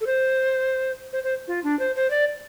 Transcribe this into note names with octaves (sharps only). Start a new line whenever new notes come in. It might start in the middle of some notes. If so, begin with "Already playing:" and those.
A4
C5
C5
C5
F4
D4
C5
C5
D5